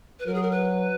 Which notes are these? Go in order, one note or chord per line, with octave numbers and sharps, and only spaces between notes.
B4
F#3 A#4
G#4
A#4
B4